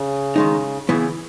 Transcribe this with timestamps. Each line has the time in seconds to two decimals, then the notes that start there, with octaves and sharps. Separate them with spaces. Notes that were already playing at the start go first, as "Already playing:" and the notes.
Already playing: C#3
0.36 D#3 G#3 D#4
0.89 C#3 E3 B3 E4